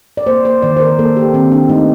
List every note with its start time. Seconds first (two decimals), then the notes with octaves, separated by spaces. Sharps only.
0.17 D5
0.27 A#3 C5
0.45 A#3 C5
0.62 D#3 D5
0.77 C5
0.80 D#3 A#4
0.99 A#3 A4
1.16 A#3 G4
1.34 D#3 C4
1.52 D#3 D4
1.69 A3 D#4